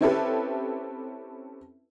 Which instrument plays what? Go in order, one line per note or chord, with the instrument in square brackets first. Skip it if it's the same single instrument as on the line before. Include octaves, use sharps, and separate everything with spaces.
[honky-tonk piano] C4 C#4 E4 G4 A4 B4